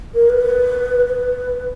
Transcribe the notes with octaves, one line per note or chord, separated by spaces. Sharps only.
A#4
B4
B4